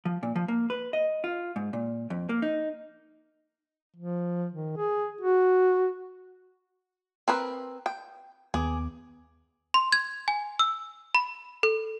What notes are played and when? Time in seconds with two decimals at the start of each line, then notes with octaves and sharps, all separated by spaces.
0.05 F3
0.23 A#2
0.36 F3
0.48 A#3
0.70 B4
0.93 D#5
1.24 F4
1.56 G#2
1.73 A#2
2.10 F2
2.29 A#3
2.42 D#4
3.97 F3
4.53 D#3
4.77 G#4
5.21 F#4
7.28 C4 A#4 B4
7.86 G5
8.54 D#2 B3 G#4 D6
9.74 C6
9.92 G#6
10.28 G#5
10.59 E6
11.15 B5
11.63 A4